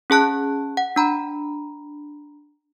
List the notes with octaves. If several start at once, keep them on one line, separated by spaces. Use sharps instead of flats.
C#4 G#4 A5 F#6
F#5
D4 A#5 B5